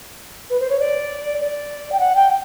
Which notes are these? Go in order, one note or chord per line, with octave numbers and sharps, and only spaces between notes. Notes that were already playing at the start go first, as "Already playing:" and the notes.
B4
C5
C#5
D5
D5
G5
F#5
G5